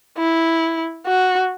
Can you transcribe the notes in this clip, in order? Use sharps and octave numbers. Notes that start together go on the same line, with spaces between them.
E4
F#4